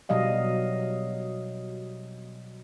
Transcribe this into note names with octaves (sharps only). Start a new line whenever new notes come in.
B2 F#3 G3 D#5 F5